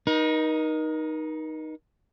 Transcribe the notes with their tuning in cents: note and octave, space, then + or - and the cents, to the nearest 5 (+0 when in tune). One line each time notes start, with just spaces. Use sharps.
D#4 +0 A#4 +40